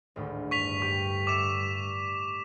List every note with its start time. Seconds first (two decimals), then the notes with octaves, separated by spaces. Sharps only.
0.16 G#1 D2 A2
0.51 G2 C#6 B6 F7
0.82 G4 C#6
1.27 D5 E5 D6 C#7 E7